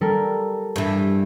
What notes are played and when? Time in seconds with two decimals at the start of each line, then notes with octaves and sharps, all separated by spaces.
0.01 G3 A4 A#4
0.76 G2 E3